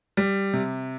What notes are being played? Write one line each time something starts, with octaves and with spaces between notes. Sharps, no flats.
G3
C3